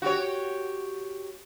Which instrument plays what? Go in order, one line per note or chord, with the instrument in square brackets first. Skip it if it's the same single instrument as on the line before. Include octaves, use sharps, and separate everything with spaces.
[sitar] F#4 G4 C#5